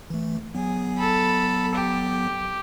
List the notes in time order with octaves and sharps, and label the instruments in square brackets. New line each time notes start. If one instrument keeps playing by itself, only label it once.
[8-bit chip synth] E3 A3
[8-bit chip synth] F#3 B3 [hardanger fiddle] G#4
[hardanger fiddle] A4 B5
G4